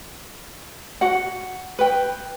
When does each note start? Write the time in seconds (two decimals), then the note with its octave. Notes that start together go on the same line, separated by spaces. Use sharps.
1.01 F#4 F#5
1.79 B4 G5